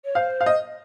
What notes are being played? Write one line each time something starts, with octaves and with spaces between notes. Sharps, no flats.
C#5
C5 F5
F5
D#5